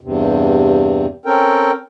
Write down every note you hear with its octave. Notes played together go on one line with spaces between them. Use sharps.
E2 G2 C3
C4 C#4 A4 A#4 G5